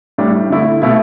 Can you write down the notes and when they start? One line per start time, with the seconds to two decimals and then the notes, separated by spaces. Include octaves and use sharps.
0.18 A2 G3 D4
0.50 D3 A3 E4
0.82 B2 A3 E4